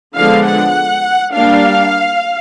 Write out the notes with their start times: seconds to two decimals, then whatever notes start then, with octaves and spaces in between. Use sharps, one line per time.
0.15 D3 F3 G#3 B3 D4 F5
0.44 F#5
1.33 G3 A#3 D4 F5